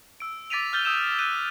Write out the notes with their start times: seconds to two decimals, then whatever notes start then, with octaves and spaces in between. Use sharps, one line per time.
0.20 E6 D7
0.50 D6 A6 B6 D7 D#7 F7
0.73 E6 F6 G6 A6 G7
0.85 D#6 E6 G6 E7
1.19 F#6 G6 D#7 G7